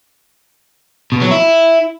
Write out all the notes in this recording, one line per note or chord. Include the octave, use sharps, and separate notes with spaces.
B2
F#3
E4